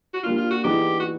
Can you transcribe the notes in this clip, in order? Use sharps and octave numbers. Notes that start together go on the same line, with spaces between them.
F#4
G3 A#3 D4 F4
F4
F#4
E3 G3 B3 D#4 G4 G#4
F#4